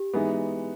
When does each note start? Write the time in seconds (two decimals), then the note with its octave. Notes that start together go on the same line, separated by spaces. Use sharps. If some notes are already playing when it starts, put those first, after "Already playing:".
Already playing: G4
0.14 E3 G#3 B3 D#4